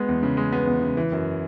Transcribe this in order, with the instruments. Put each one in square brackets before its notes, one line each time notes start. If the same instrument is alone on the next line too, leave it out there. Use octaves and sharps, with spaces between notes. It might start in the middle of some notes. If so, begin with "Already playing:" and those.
Already playing: [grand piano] G#3 B3
E2
C#3
G#3
B3
E2
C#3
E3
F#2